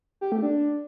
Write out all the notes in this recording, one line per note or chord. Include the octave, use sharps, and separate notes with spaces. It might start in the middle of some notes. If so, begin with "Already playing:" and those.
G4
A3
D4